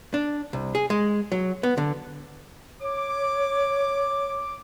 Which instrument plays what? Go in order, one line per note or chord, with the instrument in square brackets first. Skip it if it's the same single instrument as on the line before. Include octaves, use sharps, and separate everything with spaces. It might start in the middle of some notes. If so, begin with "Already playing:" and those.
[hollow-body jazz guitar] D4
C2
G#4
G#3
F#3
B3
D3
[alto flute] C#5 [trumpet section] D6